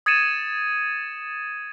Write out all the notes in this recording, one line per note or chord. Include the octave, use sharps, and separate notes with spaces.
D#6 G#6 A6 C#7 D#7 E7